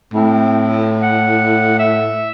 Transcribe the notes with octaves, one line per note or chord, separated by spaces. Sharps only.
A2 C4
F#5
E5